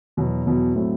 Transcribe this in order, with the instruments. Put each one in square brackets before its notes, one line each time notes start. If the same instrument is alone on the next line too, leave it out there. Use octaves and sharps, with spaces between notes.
[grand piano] E2 B2 F#3 B3
E2 B2 F#3 B3
A2 F#3 A3 C4